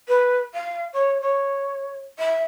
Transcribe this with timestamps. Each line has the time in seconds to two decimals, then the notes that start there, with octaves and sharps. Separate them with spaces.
0.08 B4
0.54 F5
0.93 C#5
1.21 C#5
2.19 E5